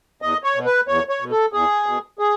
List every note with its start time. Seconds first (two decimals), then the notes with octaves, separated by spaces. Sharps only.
0.22 E2 D#5
0.44 C#5
0.55 B2
0.65 B4
0.88 E2 C#5
1.09 C#5
1.20 B2
1.31 A4
1.53 E2 G#4
1.86 B2
2.19 G#4